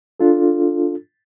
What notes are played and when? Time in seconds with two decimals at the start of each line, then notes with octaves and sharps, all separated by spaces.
0.20 D4 F4 A4